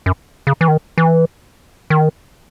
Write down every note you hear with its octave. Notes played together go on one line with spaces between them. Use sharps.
F#2
C#3
E3
D#3
E3
D#3